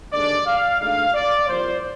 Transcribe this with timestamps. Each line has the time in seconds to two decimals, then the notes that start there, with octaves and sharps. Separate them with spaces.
0.13 D#2 D3 G#3 D4 D5
0.47 F5
0.81 D2 D3 G#3 D#4 F5
1.15 D5
1.49 C2 A#2 F3 C5